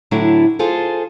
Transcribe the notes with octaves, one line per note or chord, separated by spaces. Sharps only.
A2 D3 F#3 D4 E4
F4 G#4 A4 C5